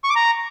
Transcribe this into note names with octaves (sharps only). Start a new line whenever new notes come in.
C#6
D6
A#5